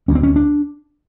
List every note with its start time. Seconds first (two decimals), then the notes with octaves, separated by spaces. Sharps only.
0.08 D2 C#4
0.15 C4
0.23 C#4
0.36 D4